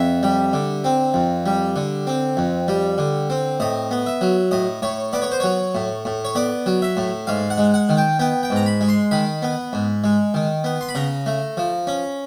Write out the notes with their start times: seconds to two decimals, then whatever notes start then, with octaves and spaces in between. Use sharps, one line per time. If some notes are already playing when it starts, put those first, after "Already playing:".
Already playing: F2 E5
0.23 G3
0.53 D3
0.84 C4
1.14 F2
1.46 G3
1.76 D3
2.07 C4
2.37 F2
2.68 G3
2.98 D3
3.30 C4
3.60 A2 D#5
3.91 B3
4.06 E5
4.21 F#3
4.51 A2 D#5
4.82 A2 C#5
5.13 B3 D5
5.22 C#5
5.32 C5
5.40 F#3 C#5
5.75 A2
6.05 A2
6.25 C#5
6.35 B3 D5
6.66 F#3
6.82 E5
6.97 A2
7.27 G#2 F5
7.50 F#5
7.58 G#3
7.74 F#5
7.89 D#3
7.97 G5
8.19 B3 G5
8.43 G5
8.50 G#2
8.56 A#5
8.66 B5
8.81 G#3
8.89 C6
9.11 D#3 B5
9.42 B3
9.73 G#2
10.04 G#3
10.34 D#3
10.64 B3
10.81 C6
10.89 B5
10.95 C#3 A#5
11.26 A3
11.57 F3
11.87 C#4